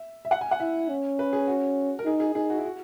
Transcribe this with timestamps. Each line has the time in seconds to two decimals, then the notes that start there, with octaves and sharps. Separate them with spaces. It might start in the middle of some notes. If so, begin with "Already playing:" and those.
Already playing: E5
0.25 E5
0.31 F#5
0.41 G#5
0.51 F#5
0.60 E4 E5
0.89 C#4
1.19 B4
1.33 G#4
1.47 F#4
1.99 A#4
2.05 D#4 G#4
2.20 G#4
2.35 D#4 G#4
2.50 F#4
2.57 E4
2.65 F#4